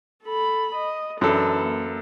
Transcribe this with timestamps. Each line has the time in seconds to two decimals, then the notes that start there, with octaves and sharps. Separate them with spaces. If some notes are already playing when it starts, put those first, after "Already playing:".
0.24 A4 B5
0.75 D#5
1.21 F#2 E3 D4 A4
1.61 A#3